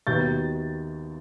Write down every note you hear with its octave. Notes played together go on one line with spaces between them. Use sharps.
D#2 D#3 F#3 B3 G6 A6